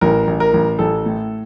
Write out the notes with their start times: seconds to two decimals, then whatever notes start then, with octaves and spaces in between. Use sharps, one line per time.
0.01 A1 A#4
0.27 A1
0.40 A#4
0.54 A1
0.79 A1 A4
1.06 A2